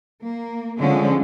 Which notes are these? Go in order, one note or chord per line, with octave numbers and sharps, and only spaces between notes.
A#3
D3 F3 G#3 C#4